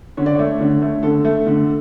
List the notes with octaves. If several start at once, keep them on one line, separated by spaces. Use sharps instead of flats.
D3 C#5
D5
A3 C#5
D3
A3
D3 A4
A3
D3